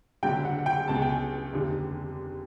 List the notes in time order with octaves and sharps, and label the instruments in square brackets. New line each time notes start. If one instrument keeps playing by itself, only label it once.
[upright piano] F#1 F#2 D3 G5
F#5
F#5
G5
C#2 B2 A5
G#5
G5
G#5
F1 D#2 D3